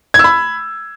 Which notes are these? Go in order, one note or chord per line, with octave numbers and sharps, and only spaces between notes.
G#6
E6
B5